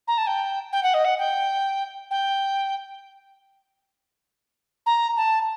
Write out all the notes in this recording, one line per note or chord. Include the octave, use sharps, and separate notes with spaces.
A#5
A5
G5
G5
F#5
D#5
F#5
G5
G5
A#5
A5